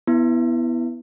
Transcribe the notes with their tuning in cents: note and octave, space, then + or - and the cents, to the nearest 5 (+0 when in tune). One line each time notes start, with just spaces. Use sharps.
B3 +0 E4 +0